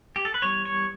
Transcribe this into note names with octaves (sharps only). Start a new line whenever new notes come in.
G4
A4
B4
E3 G3 B3 C#5
C#5